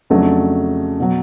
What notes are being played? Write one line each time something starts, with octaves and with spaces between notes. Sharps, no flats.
F2 C#3 F#3 A3 D4
B2 F#3